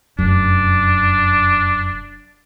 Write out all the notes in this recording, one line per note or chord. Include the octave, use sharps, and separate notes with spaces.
F1 F#2 D4